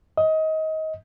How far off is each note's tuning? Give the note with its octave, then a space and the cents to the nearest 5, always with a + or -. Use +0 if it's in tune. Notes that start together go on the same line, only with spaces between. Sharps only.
D#5 +25